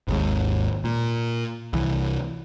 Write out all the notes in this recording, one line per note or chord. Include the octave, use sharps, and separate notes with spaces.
G#1 D#2 G#2
A#2
C2 E3